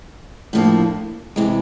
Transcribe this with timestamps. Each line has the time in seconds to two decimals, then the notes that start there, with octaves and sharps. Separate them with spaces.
0.53 A2 F3 A#3 D4
1.36 C3 E3 G#3